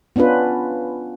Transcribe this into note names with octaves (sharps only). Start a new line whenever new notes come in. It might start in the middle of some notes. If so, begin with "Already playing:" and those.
B3 C#4 D4 F4 B4